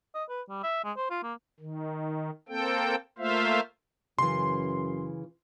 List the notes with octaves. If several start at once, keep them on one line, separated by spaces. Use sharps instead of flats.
D#5
B4
G3
E5
G#3
C5
F4
A#3
D#3
A#3 C4 A4 G5
A3 A#3 F4 C5 E5 F5
F#2 C#3 E3 C6